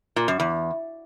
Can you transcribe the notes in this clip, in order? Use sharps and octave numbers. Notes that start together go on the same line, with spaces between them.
A#2
F#2
E2